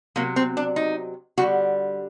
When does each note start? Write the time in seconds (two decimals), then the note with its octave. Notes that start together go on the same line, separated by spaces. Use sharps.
0.16 C3 F#3 A#3
0.36 C4
0.57 D4
0.76 D#4
1.38 D3 G3 F#4